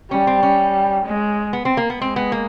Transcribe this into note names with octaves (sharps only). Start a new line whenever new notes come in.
G3 C#4
C4
C#4
G#3
B3
C4
A#3
B3
G#3 C4
B3
A#3